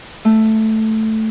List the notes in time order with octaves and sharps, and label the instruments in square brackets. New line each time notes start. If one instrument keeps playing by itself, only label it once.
[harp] A3